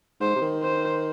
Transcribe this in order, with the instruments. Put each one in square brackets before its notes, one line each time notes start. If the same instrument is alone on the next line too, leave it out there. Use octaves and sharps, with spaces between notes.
[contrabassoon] G#2 [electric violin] C5
[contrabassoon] C3
D#3
[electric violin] C5